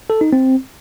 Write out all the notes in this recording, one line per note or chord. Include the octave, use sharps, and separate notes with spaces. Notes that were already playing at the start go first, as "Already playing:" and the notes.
A4
D#4
C4